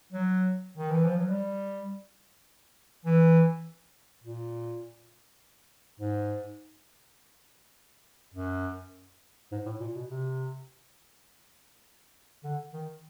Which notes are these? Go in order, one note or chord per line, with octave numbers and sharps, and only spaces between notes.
F#3
D#3
E3
F3
F#3
G3
E3
A#2
G#2
F#2
G#2
A2
A#2
B2
C3
D3
D#3